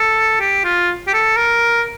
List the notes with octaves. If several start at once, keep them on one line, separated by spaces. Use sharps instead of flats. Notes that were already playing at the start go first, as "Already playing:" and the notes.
Already playing: A4
G4
F4
G4
A4
A#4